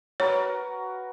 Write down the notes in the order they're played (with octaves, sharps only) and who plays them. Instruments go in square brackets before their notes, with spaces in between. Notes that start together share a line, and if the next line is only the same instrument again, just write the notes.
[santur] F#4 A#4 B4 [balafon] C#5